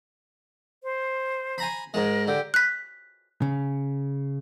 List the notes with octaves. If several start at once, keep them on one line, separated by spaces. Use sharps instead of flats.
C5
G#5 A#5 B5
G#2 G#3 A#4
D3 G4
F#6 B6
C#3